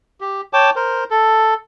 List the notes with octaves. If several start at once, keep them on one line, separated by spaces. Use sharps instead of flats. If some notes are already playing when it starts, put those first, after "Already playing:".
G4
C#5 G5 A5 D6
A#4 C5
A4